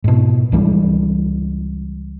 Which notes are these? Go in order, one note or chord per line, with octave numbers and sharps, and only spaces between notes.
G#2 B2
C#2 E3 G3 G#3